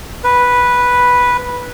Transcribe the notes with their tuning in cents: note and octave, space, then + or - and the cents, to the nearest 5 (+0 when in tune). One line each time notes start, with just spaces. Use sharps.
B4 -5